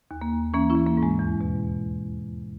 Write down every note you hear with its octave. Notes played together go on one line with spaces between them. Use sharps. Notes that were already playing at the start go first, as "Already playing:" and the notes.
D#2
A#3
D#2
E3 A#3 C#4
C#4 E4
E3
A#3
G#2
G#3
E2
B2